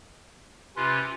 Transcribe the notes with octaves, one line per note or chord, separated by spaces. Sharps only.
C3 C#4 F4 B4 C6